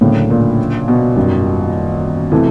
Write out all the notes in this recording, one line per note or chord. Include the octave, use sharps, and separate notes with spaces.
D2 A2 C#3 F#3 A#3 D4
A#2
B2
G#1 F#2 D#3 G3
C3 E3 A3